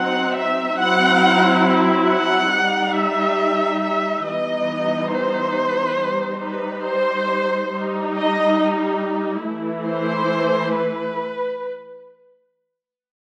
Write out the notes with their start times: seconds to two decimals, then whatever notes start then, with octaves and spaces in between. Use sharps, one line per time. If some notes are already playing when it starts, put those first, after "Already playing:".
Already playing: F#3 C4 D#4 F#5
0.36 E5
0.79 F#3 C4 E4 F#5
2.09 F#5
2.52 G3 D#4
2.96 E5
3.82 E5
4.26 E3 G3 B3 D#4 D#5
5.12 C5
5.99 G3 D#4
6.42 B4
6.86 C5
7.72 G3 D#4
8.16 D#5
9.45 E3 A3 E4
9.89 C5
10.76 B4